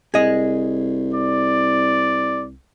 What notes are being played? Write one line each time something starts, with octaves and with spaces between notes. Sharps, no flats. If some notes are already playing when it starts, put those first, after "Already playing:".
C2 G#4 D#5
D5